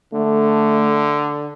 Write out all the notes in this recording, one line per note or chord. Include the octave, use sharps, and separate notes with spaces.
D3 A3